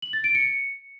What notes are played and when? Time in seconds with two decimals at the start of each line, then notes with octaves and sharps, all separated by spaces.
0.02 F#7
0.13 A6
0.24 D7
0.35 C#7